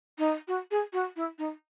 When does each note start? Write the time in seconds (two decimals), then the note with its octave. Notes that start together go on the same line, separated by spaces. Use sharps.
0.18 D#4
0.48 F#4
0.71 G#4
0.93 F#4
1.16 E4
1.39 D#4